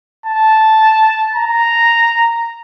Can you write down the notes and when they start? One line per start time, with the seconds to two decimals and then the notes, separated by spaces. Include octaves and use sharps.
0.26 A5
1.35 A#5